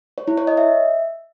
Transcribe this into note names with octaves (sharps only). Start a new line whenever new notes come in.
C#5
E4
C#5
D#5
E5